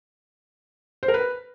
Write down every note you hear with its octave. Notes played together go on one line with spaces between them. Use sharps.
C5
A#4
B4